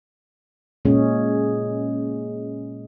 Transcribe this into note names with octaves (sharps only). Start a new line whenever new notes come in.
A#2 C#3 G#3 C#4 G#4